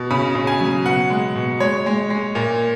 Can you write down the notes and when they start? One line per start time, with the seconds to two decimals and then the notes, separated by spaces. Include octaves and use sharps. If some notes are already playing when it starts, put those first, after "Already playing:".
Already playing: B2
0.10 C#3 B5
0.35 C#3
0.47 G#5
0.61 F#3
0.85 B2 F#5
1.10 G#3
1.35 B2
1.60 G#3 C#5
1.86 G#3
2.10 G#3
2.35 A#2